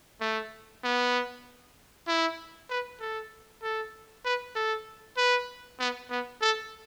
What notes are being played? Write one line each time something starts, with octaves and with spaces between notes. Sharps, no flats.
A3
B3
E4
B4
A4
A4
B4
A4
B4
B3
B3
A4